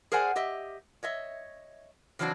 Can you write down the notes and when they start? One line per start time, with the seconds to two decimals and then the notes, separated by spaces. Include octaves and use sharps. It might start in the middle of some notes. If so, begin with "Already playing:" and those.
0.12 G#4 A#4 C5 D5 F#5 G#5
0.36 G4 D#5 E5
1.03 C#5 D#5 E5
2.19 C#3 E3 F#3 C4 D4 F#4